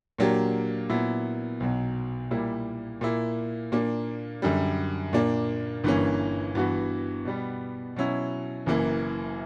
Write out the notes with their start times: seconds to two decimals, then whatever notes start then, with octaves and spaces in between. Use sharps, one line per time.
0.18 A#2 F#3 A#3 D4 G4
0.89 A#2 F#3 B3 E4
1.60 B1 B2 F#3
2.31 A#2 G3 A#3 E4
3.01 A#2 A#3 E4
3.72 A#2 A#3 D4
4.42 F#2 D3 G3
5.13 A#2 A#3 D4
5.84 G1 G2 E3 A#3 C#4
6.55 G2 E3 B3 F#4
7.25 B2 G3 B3
7.96 B2 F#3 C#4 E4
8.66 F#1 F#2 E3 A#3